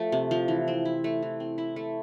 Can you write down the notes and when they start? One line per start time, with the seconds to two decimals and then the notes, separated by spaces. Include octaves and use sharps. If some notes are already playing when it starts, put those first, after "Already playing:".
Already playing: F3 A3
0.12 C3
0.31 F3
0.48 E3
0.68 C4
0.85 E4
1.04 A3
1.22 E3
1.40 C4
1.58 E4
1.76 A3